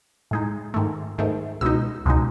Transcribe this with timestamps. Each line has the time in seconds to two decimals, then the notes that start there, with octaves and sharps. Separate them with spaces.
0.31 A2 G#3 D#4
0.74 G#2 D#3 A3
1.18 G#2 D#3 A3
1.61 C#2 B2 G#3 D#4 E6
2.06 C#2 B2 G#3 D#4